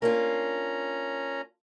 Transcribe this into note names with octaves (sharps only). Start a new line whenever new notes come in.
A#3 C#4 D4 F4 A#5